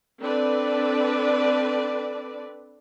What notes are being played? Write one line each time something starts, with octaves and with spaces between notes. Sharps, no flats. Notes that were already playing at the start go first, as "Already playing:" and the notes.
C4 D4 A4 B4 D5